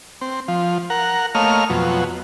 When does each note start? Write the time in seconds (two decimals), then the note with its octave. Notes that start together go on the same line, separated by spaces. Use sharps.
0.21 C4
0.48 F3
0.90 A#4 F#5
1.35 A3 A#3 C#5 D#5 F5 F6
1.70 F2 B2 F#3